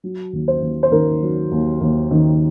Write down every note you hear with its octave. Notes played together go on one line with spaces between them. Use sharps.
F#3
D#2
C5
D#2
C5
D#3 A#4
F#3
D#2
D#2
D#3